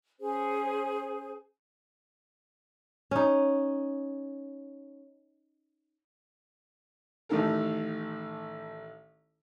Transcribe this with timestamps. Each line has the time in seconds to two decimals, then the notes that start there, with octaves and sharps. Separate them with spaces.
0.20 C#4 G#4 C5
3.11 C#4 D#4
7.29 A1 A2 D#3 A4 A#4